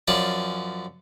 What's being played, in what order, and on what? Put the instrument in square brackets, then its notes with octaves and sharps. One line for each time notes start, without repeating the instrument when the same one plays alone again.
[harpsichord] F#2 F3 C#4 D5